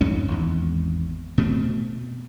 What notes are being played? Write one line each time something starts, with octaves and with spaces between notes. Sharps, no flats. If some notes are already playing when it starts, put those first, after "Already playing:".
F2 G#2 C#4
G#1 E2
B2 A3 B3 C4